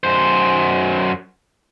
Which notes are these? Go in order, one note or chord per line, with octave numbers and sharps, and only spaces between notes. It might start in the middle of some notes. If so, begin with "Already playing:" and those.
F#2 C5